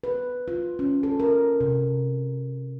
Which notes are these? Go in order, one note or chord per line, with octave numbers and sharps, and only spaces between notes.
B4
F4
C#4
A4
A#4
C3